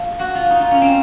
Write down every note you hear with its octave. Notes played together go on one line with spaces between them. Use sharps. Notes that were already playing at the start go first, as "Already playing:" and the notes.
Already playing: A3 F4
F#4
F4
D#4
F4
C#4
C4